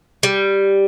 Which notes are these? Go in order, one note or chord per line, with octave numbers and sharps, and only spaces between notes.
G3